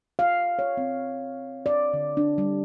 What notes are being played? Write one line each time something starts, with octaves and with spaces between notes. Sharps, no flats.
F5
C#5
C4
D5
D3
D4
G3